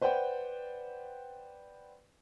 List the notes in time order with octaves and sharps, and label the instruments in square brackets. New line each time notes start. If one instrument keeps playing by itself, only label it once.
[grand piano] B4 C5 D5 F#5 G5